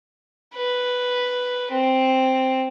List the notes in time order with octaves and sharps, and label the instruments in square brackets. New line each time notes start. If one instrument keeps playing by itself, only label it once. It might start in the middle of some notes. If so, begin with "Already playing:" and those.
[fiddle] B4
C4